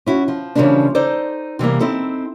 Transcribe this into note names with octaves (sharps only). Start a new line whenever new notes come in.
C#4 E4 F#4
F3
C#3 E3 F3 G3 A#3 D4
D#4 A4 C5 D5
C3 E3 G3 A#3
C4 D#4 E4 A4